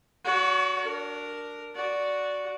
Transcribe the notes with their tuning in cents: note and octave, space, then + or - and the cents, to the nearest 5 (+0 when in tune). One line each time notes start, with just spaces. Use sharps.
F#4 +0 C#5 +45
D4 +0 A#4 +0
F#4 +0 D5 -10